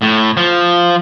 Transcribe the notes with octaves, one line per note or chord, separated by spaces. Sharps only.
A2
F3